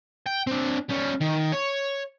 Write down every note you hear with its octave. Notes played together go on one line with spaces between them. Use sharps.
G5
C4 D4
G3 C#4
D#3
C#5